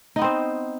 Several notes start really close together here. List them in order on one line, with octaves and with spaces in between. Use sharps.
D#4 B3 C4 C5